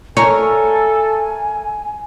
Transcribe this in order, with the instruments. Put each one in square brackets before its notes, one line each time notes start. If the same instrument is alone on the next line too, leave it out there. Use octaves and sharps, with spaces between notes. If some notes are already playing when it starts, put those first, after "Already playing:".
[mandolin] A3 A#4 [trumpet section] A4 [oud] C#5 [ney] G#5